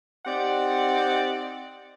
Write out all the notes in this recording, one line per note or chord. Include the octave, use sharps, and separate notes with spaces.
C4 D#4 G4 D5 F#5